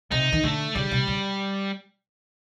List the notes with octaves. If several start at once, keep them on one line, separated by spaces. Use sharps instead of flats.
C3 D#4
D#3
D3 A3
C#3 G3
C3
C#3